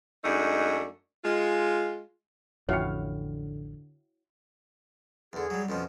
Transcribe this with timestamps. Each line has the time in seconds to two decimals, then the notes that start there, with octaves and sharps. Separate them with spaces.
0.24 F#2 G#3 A3 D4 D#4
1.24 G#3 F4
2.69 A1 F2 D3 E4 F#4 C#5 F5 G5
5.33 E2 D3 G#4
5.50 F#3 G3
5.69 F2 B2 F3 C#4